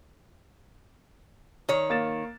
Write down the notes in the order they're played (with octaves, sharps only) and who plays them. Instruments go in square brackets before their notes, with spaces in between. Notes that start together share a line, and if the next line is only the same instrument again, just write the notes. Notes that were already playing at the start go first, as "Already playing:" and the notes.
[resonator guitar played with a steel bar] D#3 C#5
[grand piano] A#3 A6 E7